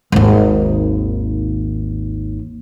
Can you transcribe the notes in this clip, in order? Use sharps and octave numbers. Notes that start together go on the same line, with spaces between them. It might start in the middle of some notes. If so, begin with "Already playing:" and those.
G#1 D#2